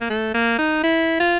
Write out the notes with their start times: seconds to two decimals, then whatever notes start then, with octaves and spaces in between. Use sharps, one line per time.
0.01 A#3
0.10 A3
0.34 A#3
0.59 D#4
0.83 E4
1.20 F4